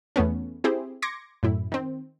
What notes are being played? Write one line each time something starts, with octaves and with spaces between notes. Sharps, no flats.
E2 A3 B3 C#4
C4 E4 G4 G#4 C5
C6 D6 G#6 A#6 C#7
F#2 A2 E4
D#3 C4